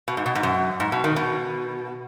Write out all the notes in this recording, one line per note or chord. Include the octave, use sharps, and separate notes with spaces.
B2
G#2
B2
G#2
F#2
G#2
B2
D#3
B2